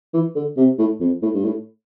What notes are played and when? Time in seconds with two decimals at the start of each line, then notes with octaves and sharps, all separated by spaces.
0.14 E3
0.36 D3
0.57 C3
0.78 A2
1.00 F2
1.22 A2
1.34 G2
1.45 A2